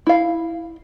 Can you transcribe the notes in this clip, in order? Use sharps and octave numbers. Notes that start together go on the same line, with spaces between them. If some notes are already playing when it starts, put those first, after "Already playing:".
E4 F5